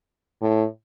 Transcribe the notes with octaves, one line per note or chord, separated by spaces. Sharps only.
A2